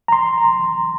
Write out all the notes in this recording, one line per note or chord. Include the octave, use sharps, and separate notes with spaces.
A#5
C6
A#5